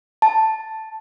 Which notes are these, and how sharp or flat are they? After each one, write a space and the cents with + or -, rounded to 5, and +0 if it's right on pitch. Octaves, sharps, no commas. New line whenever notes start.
A5 +0